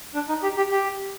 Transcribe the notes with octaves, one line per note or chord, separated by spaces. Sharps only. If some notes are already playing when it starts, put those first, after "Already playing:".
D4
D#4
G4
G4
G4